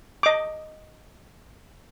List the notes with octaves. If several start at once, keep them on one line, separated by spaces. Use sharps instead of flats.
D#5 D6